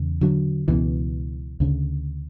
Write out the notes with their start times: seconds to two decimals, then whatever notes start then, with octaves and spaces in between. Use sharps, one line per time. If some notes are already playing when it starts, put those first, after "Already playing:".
Already playing: E2 C#3
0.21 D3 F#3
0.68 C#2 B2 E3
1.60 D2 C#3